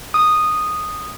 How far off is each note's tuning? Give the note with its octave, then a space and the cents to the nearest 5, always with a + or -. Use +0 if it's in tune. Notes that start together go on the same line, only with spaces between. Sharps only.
D#6 -10